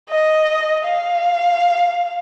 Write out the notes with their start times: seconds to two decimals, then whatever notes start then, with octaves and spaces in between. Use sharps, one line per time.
0.09 D#5
0.85 F5